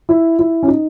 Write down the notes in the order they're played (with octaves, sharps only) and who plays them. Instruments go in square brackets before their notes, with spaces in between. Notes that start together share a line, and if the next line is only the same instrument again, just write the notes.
[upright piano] E4
E4
C#4
D#4